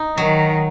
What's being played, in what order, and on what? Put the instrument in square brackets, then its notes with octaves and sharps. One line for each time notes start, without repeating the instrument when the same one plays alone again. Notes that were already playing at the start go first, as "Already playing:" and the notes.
Already playing: [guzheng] D#4
[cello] D#3 [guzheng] F#3